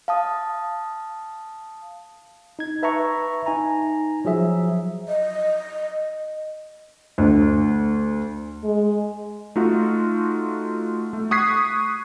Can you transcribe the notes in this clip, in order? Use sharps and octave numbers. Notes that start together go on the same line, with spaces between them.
F5 A5 D#6
D#4 G#6
B4 E5 A5 A#5 C#6
D#4 G#5 A#5
F3 F#3 G#4 E5
D#5
D2
G#3
A3 D#4 F4 F#4
A3
C#6 D#6 F#6 G#6 B6 C7